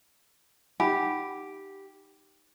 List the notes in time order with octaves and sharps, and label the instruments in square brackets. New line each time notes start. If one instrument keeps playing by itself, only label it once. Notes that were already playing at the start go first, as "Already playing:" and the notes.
[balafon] D#4 F#5 B5 [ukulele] G4